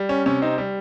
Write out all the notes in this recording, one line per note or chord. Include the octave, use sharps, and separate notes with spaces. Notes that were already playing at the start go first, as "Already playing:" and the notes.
Already playing: G3
C#4
C3 C#4
C4 D#4
G3